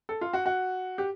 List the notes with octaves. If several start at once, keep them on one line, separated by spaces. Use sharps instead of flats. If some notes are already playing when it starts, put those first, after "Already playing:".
A4
F4
F#4
F#4
G4